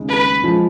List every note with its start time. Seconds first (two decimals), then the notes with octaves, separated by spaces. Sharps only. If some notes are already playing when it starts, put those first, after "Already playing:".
Already playing: D#2 C#3 G#3 D#4
0.08 B4
0.44 F3 G#3